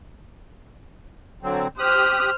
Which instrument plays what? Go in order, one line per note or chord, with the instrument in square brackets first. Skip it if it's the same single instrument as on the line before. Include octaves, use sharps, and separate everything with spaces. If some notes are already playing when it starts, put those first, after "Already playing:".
[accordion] D3 F#3 C4
[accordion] G4 D#6 F#6 [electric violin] C5 F6